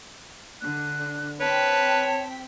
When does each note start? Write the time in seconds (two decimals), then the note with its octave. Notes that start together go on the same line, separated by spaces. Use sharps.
0.61 D3 D4 F#6
1.40 C4 B4 C#5 G5 A5 B6